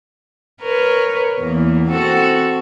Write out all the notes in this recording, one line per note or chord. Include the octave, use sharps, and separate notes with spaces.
A#4 B4 C#5
E2 A#3
C4 F#4 A4